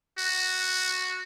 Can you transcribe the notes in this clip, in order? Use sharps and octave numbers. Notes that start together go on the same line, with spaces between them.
F#4